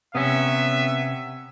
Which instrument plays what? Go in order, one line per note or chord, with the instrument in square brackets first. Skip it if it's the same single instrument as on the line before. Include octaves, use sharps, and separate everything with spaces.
[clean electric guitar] C3 C#4 [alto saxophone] B3 [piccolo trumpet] E5